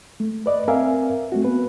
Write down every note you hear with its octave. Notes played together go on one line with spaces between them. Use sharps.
A3
B4 D5 D#5
C4 A#4 E5 F5 G#5
A3 C4 F#4
B3 B4